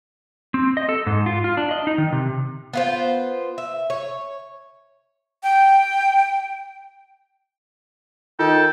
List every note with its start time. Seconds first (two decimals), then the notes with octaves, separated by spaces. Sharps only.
0.54 C4
0.77 D#5
0.89 A4
1.06 G#2
1.26 F4
1.44 F4
1.57 D4
1.71 D#5
1.87 D#4
1.98 D#3
2.12 C3
2.73 B3 F4 C5
3.58 E5
3.90 C#5
5.43 G5
8.39 D#3 F4 A4 G5